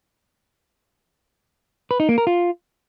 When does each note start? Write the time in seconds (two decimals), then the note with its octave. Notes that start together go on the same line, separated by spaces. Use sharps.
1.91 B4
2.00 D#4
2.09 A#3
2.18 A#4
2.27 F4